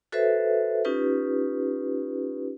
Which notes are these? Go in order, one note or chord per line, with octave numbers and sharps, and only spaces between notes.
F#4 A4 B4 C5 E5
C#4 D#4 F4 G4 B4